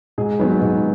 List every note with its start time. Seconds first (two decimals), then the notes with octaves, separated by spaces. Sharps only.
0.18 G#2 G#4
0.39 D#3 F#3 B3 B4
0.51 B4
0.61 G#2